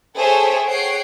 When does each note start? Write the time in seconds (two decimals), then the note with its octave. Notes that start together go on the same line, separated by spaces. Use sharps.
0.17 G#4 A4 C5 C#5 E5 G5
0.67 G#4 C#5 F#5 G5 C7 D7